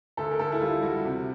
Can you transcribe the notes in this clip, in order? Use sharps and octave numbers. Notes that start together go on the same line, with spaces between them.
D2 A4
A#4
D2 A4
E4
G3 F4
G3 F#4
C3